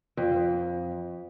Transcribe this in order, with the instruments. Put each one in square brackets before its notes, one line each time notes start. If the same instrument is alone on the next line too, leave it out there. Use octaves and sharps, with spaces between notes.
[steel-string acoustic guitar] F2